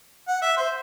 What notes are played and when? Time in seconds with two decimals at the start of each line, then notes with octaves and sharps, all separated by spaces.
0.28 F#5
0.42 E5
0.57 C5